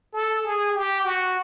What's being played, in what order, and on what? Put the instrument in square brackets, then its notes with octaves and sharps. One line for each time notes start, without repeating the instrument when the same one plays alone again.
[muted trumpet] A4
G#4
G4
F#4